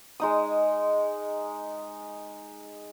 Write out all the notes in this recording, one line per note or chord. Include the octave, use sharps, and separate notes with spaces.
G#3 D#4 D#6